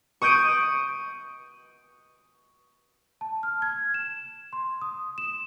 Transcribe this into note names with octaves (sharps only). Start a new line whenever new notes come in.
C#6 D#6 F#6 G6 D7 D#7
A5
F6
G#6
E7
C6
D#6
E7